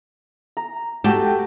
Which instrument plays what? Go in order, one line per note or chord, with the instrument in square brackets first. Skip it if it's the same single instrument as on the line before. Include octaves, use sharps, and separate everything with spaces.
[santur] A#5
[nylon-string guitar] A3 G5 A5 [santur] F#4 G4